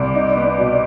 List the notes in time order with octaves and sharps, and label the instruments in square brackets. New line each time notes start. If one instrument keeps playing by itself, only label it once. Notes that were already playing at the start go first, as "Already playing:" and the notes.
Already playing: [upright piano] C2 [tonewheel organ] D5
[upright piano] D#4
B3
B2